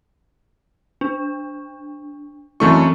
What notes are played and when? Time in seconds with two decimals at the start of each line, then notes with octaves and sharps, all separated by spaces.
1.01 D4
2.60 F#2 E3 A3 C4 E4 C#6